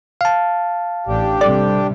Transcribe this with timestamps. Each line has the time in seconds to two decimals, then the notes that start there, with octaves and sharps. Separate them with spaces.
0.21 F5 A5
1.06 A1 D4 G4
1.41 C3 G3 A4 D5